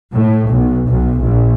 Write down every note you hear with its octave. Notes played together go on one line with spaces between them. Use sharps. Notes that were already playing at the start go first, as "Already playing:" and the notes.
A2
B1
B1
A#1